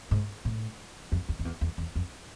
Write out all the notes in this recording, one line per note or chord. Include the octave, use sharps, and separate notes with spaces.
G#2
A2
F2
E2
F2
E2
E2
E2
F2